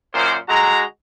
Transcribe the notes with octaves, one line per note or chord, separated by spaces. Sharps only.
F#2 A#2 C5
D3 G#3 F#4 A#5